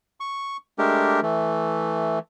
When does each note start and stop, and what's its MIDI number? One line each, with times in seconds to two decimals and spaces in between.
0.20 0.57 85
0.79 1.20 56
0.79 1.20 57
0.79 1.20 62
0.79 1.20 67
0.79 1.20 70
1.22 2.19 52
1.22 2.19 57